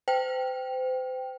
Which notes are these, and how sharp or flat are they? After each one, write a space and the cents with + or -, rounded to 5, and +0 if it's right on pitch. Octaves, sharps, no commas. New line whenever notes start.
C5 -35 G5 +0